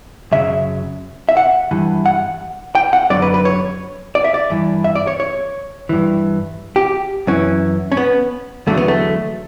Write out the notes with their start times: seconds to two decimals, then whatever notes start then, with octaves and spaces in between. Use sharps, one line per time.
0.32 F#2 C#3 F#3 E5
1.29 E5
1.37 F#5
1.71 G2 E3
2.06 F#5
2.75 G5
2.93 F#5
3.10 F#2 D3 F#3 D5
3.22 B4
3.34 B4
3.45 C#5
4.15 D5
4.24 E5
4.34 D5
4.50 G2 E3
4.84 E5
4.95 D5
5.07 C#5
5.20 C#5
5.89 G2 E3
6.76 G4
7.27 F#2 E3 C#4
7.92 C#4
7.97 B3
8.67 E2 D3 F#3 A3
8.77 B3
8.88 A3